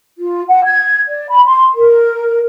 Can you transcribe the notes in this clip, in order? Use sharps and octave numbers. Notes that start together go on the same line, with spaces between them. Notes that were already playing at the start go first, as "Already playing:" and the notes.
F4
F#5
G#6
D5
B5
C6
A#4